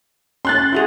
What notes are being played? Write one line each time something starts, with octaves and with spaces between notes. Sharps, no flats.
C#4 C6 F#6 A6
E4 F#4 G#4